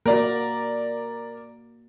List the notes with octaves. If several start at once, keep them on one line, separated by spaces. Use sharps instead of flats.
A#3 F#4 A#4 D5